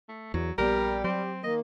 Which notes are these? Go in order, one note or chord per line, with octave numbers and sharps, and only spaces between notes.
A3
E2 F#3
A#1 D3 G3 B3 G4 A#4
F#3 C4 G4
D#3 A#3 D#5